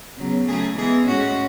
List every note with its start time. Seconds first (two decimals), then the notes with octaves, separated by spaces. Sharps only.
0.17 C#3 F#3 B3
0.47 C#3 F#3 A3 G#4
0.76 E3 G#3 B3 G#4
1.07 A2 G#3 C#4 F#4